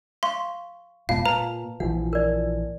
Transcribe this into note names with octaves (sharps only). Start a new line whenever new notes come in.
F5 C6 C#6
F1 B2 G#3 F4 F5 A5
A#2 B4 A5 A#5
A#1 E3 F3 F#5
A#4 D5